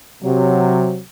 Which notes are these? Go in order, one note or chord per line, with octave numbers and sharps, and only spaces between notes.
C3 F#3